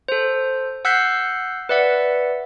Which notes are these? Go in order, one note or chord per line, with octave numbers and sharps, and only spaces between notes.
A4 C5
F#5 E6 F#6 G6 B6 C7
B4 D5 E5 F#5